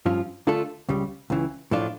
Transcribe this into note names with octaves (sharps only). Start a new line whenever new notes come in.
G2 F3 C#4 F4
D3 A3 D4 F4 A4
C#2 C#3 G3
C#2 C#3 E3
A2 F3 A3 D4 F4